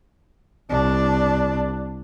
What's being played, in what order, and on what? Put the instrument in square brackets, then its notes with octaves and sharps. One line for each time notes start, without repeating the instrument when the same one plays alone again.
[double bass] C2 D4